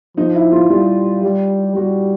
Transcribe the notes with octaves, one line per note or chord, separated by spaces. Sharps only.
F3 D#4
E4
F4
G3 F4
G3
G3 F#4